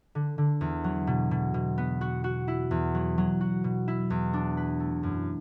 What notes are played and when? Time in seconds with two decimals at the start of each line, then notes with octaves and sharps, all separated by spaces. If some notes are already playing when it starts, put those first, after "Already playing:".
0.15 D3
0.38 D3
0.61 E2
0.84 F#3
1.07 B2
1.31 B2
1.54 B2
1.78 B3
2.01 F#4
2.24 F#4
2.48 E4
2.71 E2
2.95 F#3
3.18 F#3
3.41 F#4
3.64 B2
3.88 E4
4.10 E2
4.33 D4
4.57 B4
4.80 A3
5.03 F#2